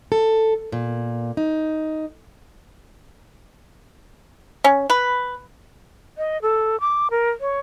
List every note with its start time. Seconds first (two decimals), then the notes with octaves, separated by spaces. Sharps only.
0.12 A4
0.72 A#2
1.37 D#4
4.64 C#4
4.90 B4
6.18 D#5
6.42 A4
6.80 D6
7.11 A#4
7.41 C#5